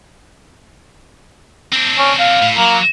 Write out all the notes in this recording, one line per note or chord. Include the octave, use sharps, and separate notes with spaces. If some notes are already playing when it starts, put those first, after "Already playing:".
C4 D4
C#4
F5
A2
F#3 A#3